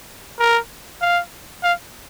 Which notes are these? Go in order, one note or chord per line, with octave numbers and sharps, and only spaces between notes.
A#4
F5
F5